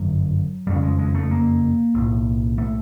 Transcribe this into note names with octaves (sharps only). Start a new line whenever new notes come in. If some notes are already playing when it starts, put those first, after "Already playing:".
Already playing: G1 F#2 D3 F#3
F#1 F2 C#3 G3
G#3
G#3
A3
A#3
B1 A2
A3